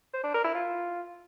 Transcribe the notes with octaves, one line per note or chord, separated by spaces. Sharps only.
C5
D4
A#4
E4
F4